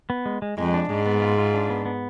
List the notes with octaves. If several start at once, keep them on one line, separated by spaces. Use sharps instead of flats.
B3
G#3
G#3
F2 G#3
D4
G#2 G#3
B3
F4
F4
D4
B3
B3